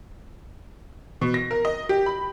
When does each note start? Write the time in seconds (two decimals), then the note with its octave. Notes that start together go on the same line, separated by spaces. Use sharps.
1.21 B2
1.34 A#6
1.51 A#4
1.65 D#5
1.89 G4
2.06 B5